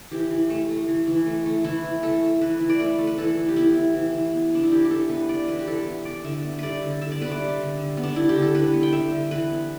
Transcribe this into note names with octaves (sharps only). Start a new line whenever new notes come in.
E3 G4
E3
A3
A3
E3
E3
A3
A3
E3 E4
E3
A3 A4
A3
E3 B4
E3
D5
A3 B4
A3
B4
E3 A4
E3
G4
B3 E4
B3
E3
E3
B3
B3 D4
E4
E3 G4
G4
E3 A4
B3 B4
B3 D5
E3 B4
G4
E3 A4
B3
B3 D5
D3 E5
B3
G3 B4 D5
D3
D3 E5
D5
B3 B4
D5
G3
D3
D3
B3
D4
G3 E4
G4
D3
A4
D3 B4
B3
G5
G3 E5
D3
E3 B4
B3